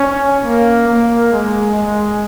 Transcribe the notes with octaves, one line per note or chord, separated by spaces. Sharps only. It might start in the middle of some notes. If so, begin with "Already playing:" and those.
Already playing: C#4
A#3
A#3
G#3
G#3